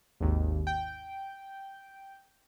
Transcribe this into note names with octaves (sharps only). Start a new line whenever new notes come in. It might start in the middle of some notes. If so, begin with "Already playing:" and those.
G#1 D#2
G5